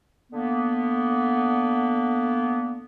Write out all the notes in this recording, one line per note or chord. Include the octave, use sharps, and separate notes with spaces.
D3 A#3 B3